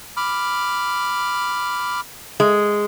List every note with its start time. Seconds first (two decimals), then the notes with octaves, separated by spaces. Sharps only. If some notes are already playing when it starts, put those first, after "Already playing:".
0.17 B5 D6 F6
2.40 G#3